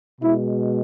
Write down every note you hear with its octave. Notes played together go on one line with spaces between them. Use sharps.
B2 G#3 E4